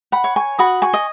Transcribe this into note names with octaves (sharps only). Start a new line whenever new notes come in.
F#5 B5
C#5
G#5 C#6
F#4 B5 D#6
G#5 C#6
D#5